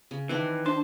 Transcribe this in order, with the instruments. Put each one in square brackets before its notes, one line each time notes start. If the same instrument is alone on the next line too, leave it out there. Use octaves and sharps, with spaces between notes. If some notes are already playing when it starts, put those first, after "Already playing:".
[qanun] C#3
[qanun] D#3 C4 D4 [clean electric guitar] E3
[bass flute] D4 [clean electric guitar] C5 [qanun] A5